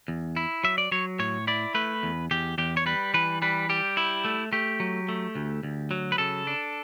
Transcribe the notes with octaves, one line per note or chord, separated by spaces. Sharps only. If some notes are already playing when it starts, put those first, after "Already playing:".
E2
E4
F#3 E5
D5
F#3 C#5
A2 C#5
E4 D5
A3 B4
E2
E2 G4
E2 G4
C#5
G3 B4
E3 B4
G3 B4
G3 G4
E4
A3
A3 G4
F#3
A3
D2
D2
F#3
B4
C#3 A4
D4